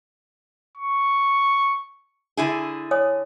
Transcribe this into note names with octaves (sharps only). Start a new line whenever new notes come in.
C#6
D3 E4 G#4
C#5 G#5 D#6